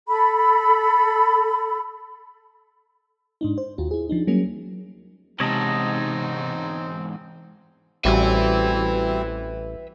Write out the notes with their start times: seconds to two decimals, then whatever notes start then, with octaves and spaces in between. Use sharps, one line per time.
0.08 A4 B5
3.41 G#2 D4 D#4
3.58 C5
3.78 D#2 F4 F#4
3.91 E4 G#4
4.09 F3 D4 D#4
4.27 F#3 G3 A#3 C#4 G#4
5.40 E2 G#2 C3 C4 D#4 C#5 D#5 A5
8.05 A1 G3 C4 E4 F#4 G4 B4 E5